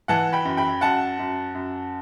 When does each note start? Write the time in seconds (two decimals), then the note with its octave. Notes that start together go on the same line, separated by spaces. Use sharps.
0.08 E3 F#5 A5
0.33 G5 B5
0.45 F#2
0.57 G5 B5
0.81 F#2 F#5 A5
1.19 F#2
1.55 F#2